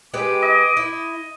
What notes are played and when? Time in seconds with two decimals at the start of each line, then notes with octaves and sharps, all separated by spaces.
0.14 G#3 G4 B4 D6
0.42 D#5
0.77 E4